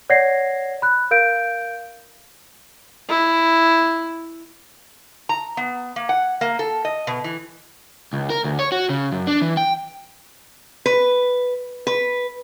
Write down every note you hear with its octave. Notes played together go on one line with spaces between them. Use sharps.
C#5 D5 F#5 G#6 A#6 C7
B5 F#6
A#4 F5 G6 D7
E4
A#5
B3
A#3
F#5
A#3
A4
D#5
B2
E3
C#2
A#4
D2
C#5
F#4
C#3
F#2
D4
E3
G5
B4
B4